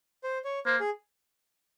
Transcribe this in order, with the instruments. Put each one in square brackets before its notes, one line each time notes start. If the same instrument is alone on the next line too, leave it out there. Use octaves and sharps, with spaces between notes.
[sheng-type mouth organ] C5
C#5
[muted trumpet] A#3 [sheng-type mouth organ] C5
[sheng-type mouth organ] G#4